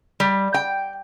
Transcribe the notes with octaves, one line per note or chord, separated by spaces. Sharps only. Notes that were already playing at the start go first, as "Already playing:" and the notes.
G3
G5